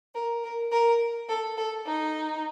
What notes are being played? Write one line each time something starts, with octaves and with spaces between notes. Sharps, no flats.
A#4
A#4
A#4
A4
A4
D#4